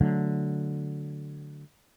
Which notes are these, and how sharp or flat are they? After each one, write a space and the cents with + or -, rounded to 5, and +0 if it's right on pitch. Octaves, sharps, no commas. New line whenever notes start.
D3 +0 F#3 +0 A3 +0